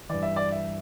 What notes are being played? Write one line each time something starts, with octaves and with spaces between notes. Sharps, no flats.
G2 E3 D5
E5
D5
E5